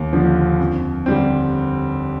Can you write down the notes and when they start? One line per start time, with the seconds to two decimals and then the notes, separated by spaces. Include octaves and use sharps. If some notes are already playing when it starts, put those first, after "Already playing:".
Already playing: D#2
0.13 D3 F3
0.60 F2
1.06 D3 G3 C4